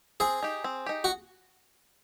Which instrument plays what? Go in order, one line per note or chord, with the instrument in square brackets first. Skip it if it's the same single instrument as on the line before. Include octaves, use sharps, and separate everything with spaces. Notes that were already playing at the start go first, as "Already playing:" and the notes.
[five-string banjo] C4 [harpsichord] G#4
[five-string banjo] D#4 G4
C4
D#4 G4
[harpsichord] F#4